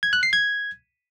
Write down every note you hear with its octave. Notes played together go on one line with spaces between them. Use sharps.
G#6
F#6
C7
G#6